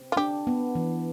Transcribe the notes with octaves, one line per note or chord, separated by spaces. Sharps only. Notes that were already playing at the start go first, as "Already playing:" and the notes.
Already playing: C4
F4
D4 G4
B3
E3